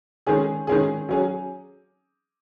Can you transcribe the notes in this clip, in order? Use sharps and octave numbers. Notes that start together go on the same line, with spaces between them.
D#3 G#3 C#4 G#4
D#3 G#3 C#4 G#4
F#3 C#4 G#4